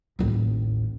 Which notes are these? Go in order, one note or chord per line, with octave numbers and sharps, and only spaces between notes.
A1 D#2